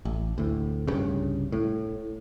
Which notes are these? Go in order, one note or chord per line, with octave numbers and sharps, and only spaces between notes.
A1
D2 A2
C2 G2 C#3
A2